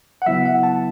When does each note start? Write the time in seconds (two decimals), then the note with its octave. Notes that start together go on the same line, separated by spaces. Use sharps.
0.22 F#5
0.26 C#3 F#3 B3 E4 E5
0.46 F#5
0.63 A5